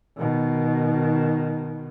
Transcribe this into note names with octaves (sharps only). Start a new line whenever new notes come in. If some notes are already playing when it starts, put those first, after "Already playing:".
B2 D#3